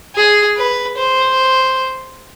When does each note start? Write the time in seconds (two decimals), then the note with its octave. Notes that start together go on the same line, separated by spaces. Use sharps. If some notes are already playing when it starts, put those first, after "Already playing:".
0.16 G#4
0.57 B4
0.98 C5